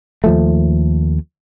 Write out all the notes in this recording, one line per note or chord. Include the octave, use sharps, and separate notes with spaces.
D#2 F3 A3